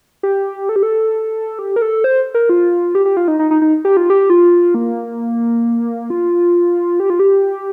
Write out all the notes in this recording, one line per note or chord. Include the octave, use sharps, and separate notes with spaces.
G4
A4
G4
A4
G4
A#4
A4
C5
A#4
F4
G4
G4
F4
D#4
D#4
D#4
D#4
G4
F4
G4
F4
A#3
F4
G4
F4
G4